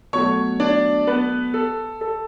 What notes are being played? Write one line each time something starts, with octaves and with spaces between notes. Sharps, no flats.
B2 F#3 A3 C#5 C#6
D4 D5
B3 B4
A4
A4